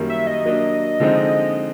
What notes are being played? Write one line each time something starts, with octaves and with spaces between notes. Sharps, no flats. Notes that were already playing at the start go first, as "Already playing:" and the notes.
Already playing: F#2 D#3 G3 A#3
E5
D#5
F#3 A#3 D4
D3 F3 G#3 C4 D#4